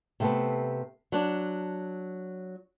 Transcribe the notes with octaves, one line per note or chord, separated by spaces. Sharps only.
C3 A3 B3
F#3 D4